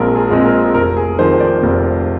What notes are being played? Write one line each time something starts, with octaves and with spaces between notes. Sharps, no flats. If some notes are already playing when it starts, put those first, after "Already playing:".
Already playing: A#1 A#2 G#3 C4 G#4 A#4
G#4
A#2 G#3 C4
A#4
F1 A#4
G#4
F2 D#3 C5
D5
F1